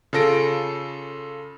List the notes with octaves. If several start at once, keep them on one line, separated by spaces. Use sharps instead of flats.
C#3 F4 A4 A#6 D7